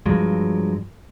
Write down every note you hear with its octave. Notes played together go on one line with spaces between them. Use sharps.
G2 F3 F#3 G#3